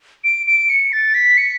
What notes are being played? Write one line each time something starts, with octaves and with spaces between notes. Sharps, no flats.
D7
D7
C#7
A6
B6
C#7